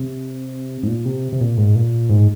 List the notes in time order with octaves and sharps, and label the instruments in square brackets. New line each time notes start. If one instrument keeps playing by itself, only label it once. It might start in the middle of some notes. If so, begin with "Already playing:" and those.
Already playing: [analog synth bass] C3
G#2
A#2
C3
C3
A#2
G#2
A#2
G#2